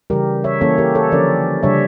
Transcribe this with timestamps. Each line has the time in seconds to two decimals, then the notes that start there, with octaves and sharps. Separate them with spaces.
0.10 C#3 E3 G3 G4 A#4
0.44 C#5 E5
0.61 E3 A#3 C#4 A4 C#5
0.78 G4 A#4
0.95 A4 C#5
1.12 D3 F3 C#4 A#4 D5
1.63 C#3 G3 D4 C#5 E5